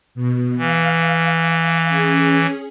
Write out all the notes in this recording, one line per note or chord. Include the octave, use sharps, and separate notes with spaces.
B2
E3 F5
C#4 G#4